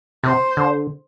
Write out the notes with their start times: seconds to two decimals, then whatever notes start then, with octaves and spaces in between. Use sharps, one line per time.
0.23 C3 C5
0.57 D3